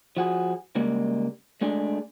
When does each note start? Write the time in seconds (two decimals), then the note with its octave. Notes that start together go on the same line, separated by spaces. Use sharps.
0.17 F3 F#4 G#4
0.75 C#3 G3 G#3 A#3
1.61 G#3 A3 D4 G#4